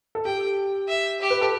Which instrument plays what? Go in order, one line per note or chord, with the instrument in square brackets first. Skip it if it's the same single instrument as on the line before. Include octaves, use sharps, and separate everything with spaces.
[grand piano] A4
[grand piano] G4 [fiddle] G5
[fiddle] E5
G4
[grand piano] B4
A4